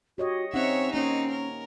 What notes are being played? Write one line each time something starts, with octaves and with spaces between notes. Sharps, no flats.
F#4 G4 C#5 D#5
C4 C#4 D#4 C#5 E5 F#5
A#3 C4 C#4 D#4 C#5
A#4